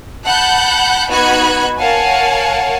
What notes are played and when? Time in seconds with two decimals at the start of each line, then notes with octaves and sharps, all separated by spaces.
0.25 F#5 A5 B5 F#6 G6
1.09 B3 D#4 F#4 B5 F#6 G#6
1.78 A#4 C#5 F5 F#5 G#5 A5